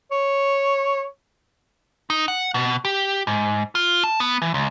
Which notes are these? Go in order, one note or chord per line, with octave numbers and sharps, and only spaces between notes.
C#5
D#4
F#5
B2
G4
G#2
F4
A5
B3
E3
C#2